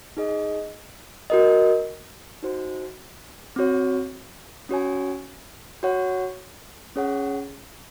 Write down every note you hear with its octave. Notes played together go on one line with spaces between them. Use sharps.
D#4 G#4 D#5
F#4 A#4 D#5
D#4 F#4 C5
C4 F#4 C#5
C#4 F#4 C#5 G#5
F#4 C#5 F#5
C#4 G#4 C#5 F#5